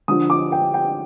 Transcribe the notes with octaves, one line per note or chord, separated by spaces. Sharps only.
D3 F3 D#6
D6
G5
G5